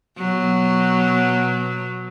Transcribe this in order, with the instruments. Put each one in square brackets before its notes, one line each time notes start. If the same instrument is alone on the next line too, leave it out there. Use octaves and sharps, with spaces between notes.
[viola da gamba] B2 F#3